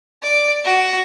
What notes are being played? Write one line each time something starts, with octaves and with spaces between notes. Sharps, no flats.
D5
F#4